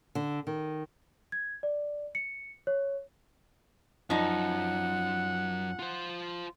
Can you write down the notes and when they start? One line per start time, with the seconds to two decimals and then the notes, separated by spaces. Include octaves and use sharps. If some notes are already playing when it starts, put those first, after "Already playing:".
0.15 D3
0.47 D#3
1.32 G#6
1.63 D5
2.15 C#7
2.67 C#5
4.10 F#2 F3 D#4 F#5
5.79 F4 C5